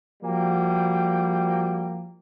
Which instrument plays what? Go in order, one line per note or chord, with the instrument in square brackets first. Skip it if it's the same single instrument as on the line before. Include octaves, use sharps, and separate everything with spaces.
[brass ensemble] F3 G3 A#3 F#4 G5